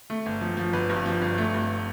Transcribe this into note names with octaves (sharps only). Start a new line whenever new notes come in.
A3
G1
F3
F3
G1 B4
G2
F3
G1
A3
G2